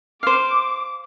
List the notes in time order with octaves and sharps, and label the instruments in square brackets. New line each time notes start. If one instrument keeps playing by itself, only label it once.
[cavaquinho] C5 F5 [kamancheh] D6